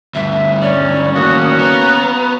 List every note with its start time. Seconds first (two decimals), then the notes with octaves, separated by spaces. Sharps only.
0.15 D2 G2 E5
0.62 C#4 D5
1.15 D#2 A2 A#3 F#4 D#6
1.59 B3 A#5